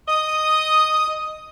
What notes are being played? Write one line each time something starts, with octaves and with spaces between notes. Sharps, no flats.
D#5 D#6